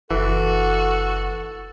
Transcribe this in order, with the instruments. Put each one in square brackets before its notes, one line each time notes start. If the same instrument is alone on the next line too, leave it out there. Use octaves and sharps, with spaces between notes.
[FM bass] F#1 [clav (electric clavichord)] E3 [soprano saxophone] F#4 [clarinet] A4